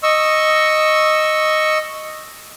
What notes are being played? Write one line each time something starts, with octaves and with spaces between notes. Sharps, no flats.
D#5 C#6 E6